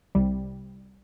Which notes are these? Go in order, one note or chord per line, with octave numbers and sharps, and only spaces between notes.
C2 C3 G3